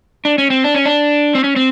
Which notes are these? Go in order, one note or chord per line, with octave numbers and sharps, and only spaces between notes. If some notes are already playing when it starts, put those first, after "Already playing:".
D4
C#4
C4
D4
C#4
D4
C4
C#4
C4